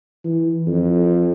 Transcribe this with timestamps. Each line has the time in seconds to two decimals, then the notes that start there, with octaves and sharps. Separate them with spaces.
0.24 E3
0.67 F2